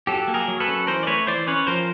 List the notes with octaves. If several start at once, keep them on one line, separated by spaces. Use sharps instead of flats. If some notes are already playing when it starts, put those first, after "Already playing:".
F#3 G4 A4
A#3
G#4 A#4
F#3
A4 B4
C#4
E3 A#4 C5
D5
A3 B4 C#5
E3 C5 D5
C#4 B4 C#5
F3 A#4 C5